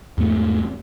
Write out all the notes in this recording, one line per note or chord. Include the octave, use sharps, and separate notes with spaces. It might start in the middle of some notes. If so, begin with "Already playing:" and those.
E2 G#2 A3